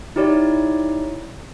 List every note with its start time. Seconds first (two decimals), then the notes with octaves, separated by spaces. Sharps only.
0.16 D#4 E4 G4 C#5 D5